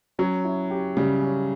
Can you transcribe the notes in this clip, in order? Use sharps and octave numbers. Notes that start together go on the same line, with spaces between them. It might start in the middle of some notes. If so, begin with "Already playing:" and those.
F#3 C#4
E4
G4
C#3 G3
C#4